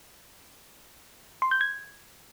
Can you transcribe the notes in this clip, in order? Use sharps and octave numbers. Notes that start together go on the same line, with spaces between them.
C6
G6
G#6